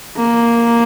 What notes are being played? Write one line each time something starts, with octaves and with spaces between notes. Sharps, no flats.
A#3